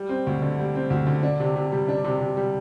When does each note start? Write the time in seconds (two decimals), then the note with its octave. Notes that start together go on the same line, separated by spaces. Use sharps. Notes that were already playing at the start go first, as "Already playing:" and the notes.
Already playing: G3
0.09 C4
0.27 D2
0.42 D3
0.59 G3
0.75 C4
0.90 D2
1.07 D3
1.23 D4
1.40 C3
1.56 C3
1.72 G3
1.88 D4
2.04 C3
2.20 C3
2.37 G3